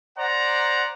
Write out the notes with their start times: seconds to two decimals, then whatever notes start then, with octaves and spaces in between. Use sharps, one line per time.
0.18 C5 D5 F#5 A#5